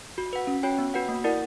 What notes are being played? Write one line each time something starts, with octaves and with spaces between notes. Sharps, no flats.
F#4
B4 F#5
C#4
F#4 C#5 G5
B3
F#4 B4 F#5
A#3
E4 A#4 D5 F#5